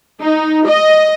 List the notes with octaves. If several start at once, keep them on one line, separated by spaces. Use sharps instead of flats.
D#4
D#5